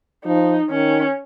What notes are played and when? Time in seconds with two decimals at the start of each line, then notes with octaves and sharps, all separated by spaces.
0.25 F3 D#4
0.71 D#3 C#4